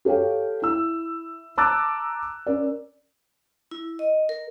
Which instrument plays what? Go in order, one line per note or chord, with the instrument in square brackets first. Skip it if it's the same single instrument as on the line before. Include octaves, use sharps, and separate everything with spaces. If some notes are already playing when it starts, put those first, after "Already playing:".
[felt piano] G4 A4 C#5 F5 G5
E4 E6
A5 A#5 D6 E6 F#6 A6
C#4 A#4 D5
[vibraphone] E4
D#5
A#4